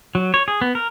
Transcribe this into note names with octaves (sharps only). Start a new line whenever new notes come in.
F#3
C#5
G#4
B3
A#4